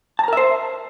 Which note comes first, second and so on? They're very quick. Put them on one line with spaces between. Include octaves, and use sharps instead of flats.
A5 A#5 A#4 E5 C5